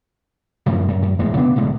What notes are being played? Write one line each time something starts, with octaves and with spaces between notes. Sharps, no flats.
F#2 A2 C3 F3
F#2
F#2
E1 A2 G#3
C#3 B3 D4
B1 A2 D3 G#3